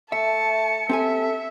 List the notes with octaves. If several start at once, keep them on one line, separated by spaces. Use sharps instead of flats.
A3 E5 A5 C#7
C4 G4 A4 E5 G#5